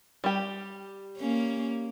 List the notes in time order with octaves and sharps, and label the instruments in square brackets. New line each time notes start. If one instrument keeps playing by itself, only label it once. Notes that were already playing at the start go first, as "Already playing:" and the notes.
[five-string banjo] G3 G4
[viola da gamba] A#3 C#4